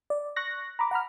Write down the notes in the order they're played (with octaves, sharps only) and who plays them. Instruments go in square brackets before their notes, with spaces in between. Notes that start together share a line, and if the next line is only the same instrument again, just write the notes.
[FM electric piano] D5
C#6 F#6 A#6
A#5 B5 D6
F#5 A#5 B5 F6